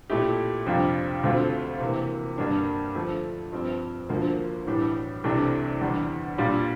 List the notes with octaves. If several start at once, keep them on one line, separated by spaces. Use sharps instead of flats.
A#2 A3 E4 G4
F2 C3 G3 D4 F4
D2 D3 A3 C4 F4
C3 E3 A#3
G2 D3 G3 A#3 D4
D3 F3 A3
G2 F3 C4
D2 D3 F3 A#3
A2 E3 G3 D4
C2 C3 E3 A3 D4
E2 D3 G3 D4
A#2 G3 D4 F4